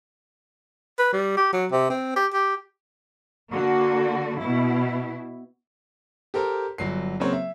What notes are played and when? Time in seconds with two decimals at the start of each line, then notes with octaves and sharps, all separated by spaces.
0.99 B4
1.13 G3
1.37 G4
1.53 F#3
1.71 C3
1.90 C4
2.16 G4
2.34 G4
3.51 D3 A#3 F#4
4.38 B2 E4
6.34 G4 A4 A#4 C5
6.78 G1 F#3 C7
7.20 C#3 F#3 A#3 C4 C#5
7.33 E5